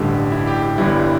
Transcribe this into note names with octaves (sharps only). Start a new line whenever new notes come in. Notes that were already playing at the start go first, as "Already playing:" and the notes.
Already playing: A1 G2 D3 G3 G4
E4
G4
G4
G1 G2 E3 G3 E4